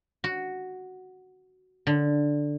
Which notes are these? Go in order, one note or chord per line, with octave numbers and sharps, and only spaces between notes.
F#4
D3